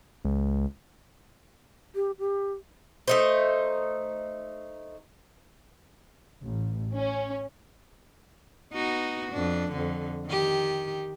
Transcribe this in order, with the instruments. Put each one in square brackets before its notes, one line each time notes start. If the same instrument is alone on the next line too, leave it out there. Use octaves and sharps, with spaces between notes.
[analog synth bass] C#2
[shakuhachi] G4
G4
[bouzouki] A3 D#4 C5
[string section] A1
C#4
[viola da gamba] B3 D#4 F#4
F2 D4
F2 D3
D#3 G4